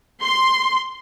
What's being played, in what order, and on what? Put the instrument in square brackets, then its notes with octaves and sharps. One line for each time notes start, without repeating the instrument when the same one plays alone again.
[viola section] C6